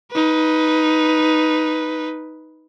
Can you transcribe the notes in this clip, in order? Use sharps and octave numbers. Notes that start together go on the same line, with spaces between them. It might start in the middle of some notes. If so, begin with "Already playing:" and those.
D#4 B4